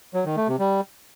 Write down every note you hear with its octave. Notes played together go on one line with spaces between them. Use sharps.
F#3
D#3
A3
C3
G3